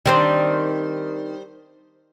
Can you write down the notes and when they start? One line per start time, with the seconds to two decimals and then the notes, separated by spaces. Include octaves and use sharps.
0.06 D#3 G3 C4 D4 C5